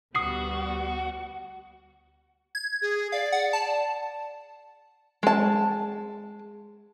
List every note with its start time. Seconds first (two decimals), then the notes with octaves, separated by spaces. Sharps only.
0.15 D2 G3 B3 F#4 D#6 C7
2.55 G#6
2.82 G#4
3.12 D5 F5
3.32 F#5
3.53 A5
5.23 G#3 A5